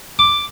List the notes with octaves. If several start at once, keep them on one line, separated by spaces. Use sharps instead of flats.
D6